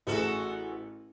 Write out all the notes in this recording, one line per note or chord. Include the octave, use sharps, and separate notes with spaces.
A1 B3 F#4 G#4 A4